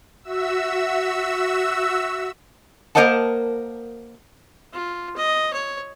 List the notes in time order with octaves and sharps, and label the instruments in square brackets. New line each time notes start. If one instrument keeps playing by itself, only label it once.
[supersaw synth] F#4 E5 E6
[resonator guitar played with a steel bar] A#3 A#4 C5 D#5 F#5 A5
[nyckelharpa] F4
D#5
C#5